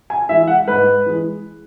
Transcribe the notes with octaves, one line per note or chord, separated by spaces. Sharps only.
G#5
E3 G#3 E5
F#5
G#2 B4
E3 G#3